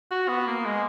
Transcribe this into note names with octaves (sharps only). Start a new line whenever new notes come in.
F#4
B3
A#3
G#3